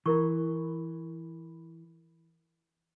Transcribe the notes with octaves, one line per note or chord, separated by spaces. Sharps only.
E3 E4 A#4 C#6